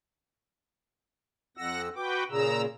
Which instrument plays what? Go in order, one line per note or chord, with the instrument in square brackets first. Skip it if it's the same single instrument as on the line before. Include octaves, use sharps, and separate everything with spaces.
[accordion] F2 E6 [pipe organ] F#5 A#6
[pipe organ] F#4 B4 G5 [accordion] D6
[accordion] A#2 C#3 [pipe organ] A#5 E6